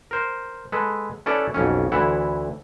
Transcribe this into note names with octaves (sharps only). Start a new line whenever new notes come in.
A#4 C5
G#3 A4 B4
C#4 E4 A4 B4 D5
B1 F2 C#4
D2 E3 E4 F#5